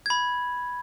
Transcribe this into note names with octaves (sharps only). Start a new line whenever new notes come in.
B5 G#6